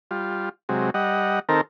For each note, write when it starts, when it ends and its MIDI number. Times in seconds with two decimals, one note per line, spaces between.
0.11 0.49 55
0.11 0.49 65
0.69 0.90 48
0.69 0.90 54
0.69 0.90 56
0.94 1.39 55
0.94 1.39 75
0.94 1.39 78
1.49 1.61 51
1.49 1.61 60
1.49 1.61 69
1.49 1.61 70